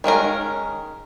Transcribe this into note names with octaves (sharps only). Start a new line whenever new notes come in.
D#3 G#3 C#4 A#4